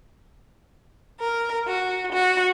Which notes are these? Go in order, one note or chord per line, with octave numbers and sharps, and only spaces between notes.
A#4
F#4
F#4